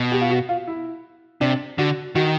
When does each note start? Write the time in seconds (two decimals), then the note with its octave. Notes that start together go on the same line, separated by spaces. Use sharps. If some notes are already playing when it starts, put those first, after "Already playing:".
Already playing: B2
0.12 G4
0.21 F4
0.30 F#4
0.49 F4
0.67 E4
1.41 C3 D4
1.78 D3 F#4
2.15 D#3 F#4